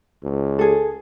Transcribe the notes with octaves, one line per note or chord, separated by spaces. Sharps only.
C#2
G#4 A4